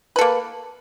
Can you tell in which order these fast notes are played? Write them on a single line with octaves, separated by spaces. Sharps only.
B4 A4 A#3